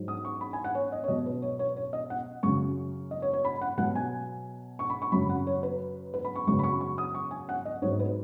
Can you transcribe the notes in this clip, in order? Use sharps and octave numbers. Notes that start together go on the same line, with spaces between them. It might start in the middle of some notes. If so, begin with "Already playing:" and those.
Already playing: G#2 F#3
D#6
C#6
B5
G#5
F#5
C#5
D#5
C#5
B2 F#3 D#5
B4
C#5
C#5
C#5
D#5
F#5
F#2 C#3 F#3 C#6
D#5
C#5
C#5
B5
F#5
B2 F#3 F#5
G#5
C#6
B5
C#6
F#2 C#3 F#3 B5
F#5
C#5
B4
B4
B5
C#6
F#2 C#3 F#3 C#6
B5
C#6
C#6
D#6
C#6
G#5
F#5
D#5
G#2 F#3 C#5
B4